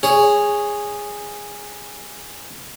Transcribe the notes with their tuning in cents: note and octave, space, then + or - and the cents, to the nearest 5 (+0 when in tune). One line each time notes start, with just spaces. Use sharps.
G#4 -10 C#5 +0